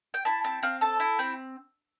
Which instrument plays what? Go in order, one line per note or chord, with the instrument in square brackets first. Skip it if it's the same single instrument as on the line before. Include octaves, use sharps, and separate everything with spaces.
[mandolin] G5
E4 A5
C4 A5
C4 F5
A4 A5
E4
C4 G5